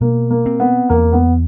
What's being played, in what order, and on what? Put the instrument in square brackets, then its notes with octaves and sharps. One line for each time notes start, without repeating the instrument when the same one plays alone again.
[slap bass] B2 [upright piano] A#3
[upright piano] A#3
[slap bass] C4
[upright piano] B3
[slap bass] E2 [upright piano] A#3
[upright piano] B3